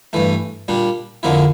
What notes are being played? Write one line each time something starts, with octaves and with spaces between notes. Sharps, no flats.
G2 E3 A3
A#2 G3 D4
F2 D3 F3 A#3 E4